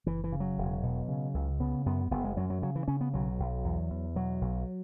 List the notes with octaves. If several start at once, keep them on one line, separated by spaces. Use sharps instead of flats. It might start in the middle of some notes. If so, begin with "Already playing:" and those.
F#1 E3
E3
C#3
F#3
E1
B2
C#3
C#2
C#3 B3
F#2 B3
F#1 B3
G#3
F#2 F#3
F#3
C#3 F#3
E3
C#3 C#4
B3
B1 F#3
B1
E2
E2
B2 F#3
B1